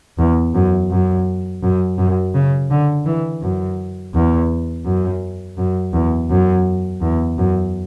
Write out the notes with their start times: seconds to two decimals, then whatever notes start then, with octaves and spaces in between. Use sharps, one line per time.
0.18 E2
0.55 F#2
0.91 F#2
1.63 F#2
1.98 F#2
2.35 C#3
2.71 D3
3.05 E3
3.42 F#2
4.14 E2
4.85 F#2
5.58 F#2
5.93 E2
6.30 F#2
7.02 E2
7.38 F#2